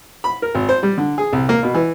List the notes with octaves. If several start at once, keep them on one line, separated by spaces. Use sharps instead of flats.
B5
A#4
G#1
C5
G3
D3
G#4
C2
A#3
B2
E3